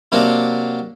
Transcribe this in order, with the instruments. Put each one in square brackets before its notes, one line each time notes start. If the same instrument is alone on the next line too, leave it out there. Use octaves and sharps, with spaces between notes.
[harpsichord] C3 F#3 A#3 D4